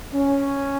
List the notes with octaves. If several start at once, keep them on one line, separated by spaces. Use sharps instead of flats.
C#4